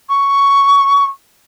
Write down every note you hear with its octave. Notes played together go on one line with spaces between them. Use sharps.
C#6